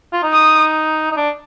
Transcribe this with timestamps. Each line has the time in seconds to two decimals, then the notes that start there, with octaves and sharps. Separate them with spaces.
0.13 F4
0.23 D#4
0.33 D#6
1.11 D#4
1.17 D4